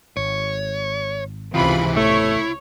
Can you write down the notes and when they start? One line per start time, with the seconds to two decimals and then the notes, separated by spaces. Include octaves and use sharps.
0.17 G#1 C#5
1.54 C#2 C3 D#3 E3 F4 B5
1.96 A1 E2 A3 E4 C#5